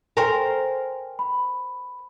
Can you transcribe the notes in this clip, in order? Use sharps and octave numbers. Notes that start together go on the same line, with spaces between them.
A#4 C5 G5 G#5
B5